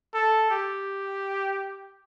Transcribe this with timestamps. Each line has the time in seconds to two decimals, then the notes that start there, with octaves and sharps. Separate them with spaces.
0.14 A4
0.51 G4